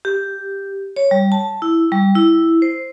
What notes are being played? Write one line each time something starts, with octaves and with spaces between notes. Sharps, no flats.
G4
C#5
G3
A5
E4
G3
E4
C5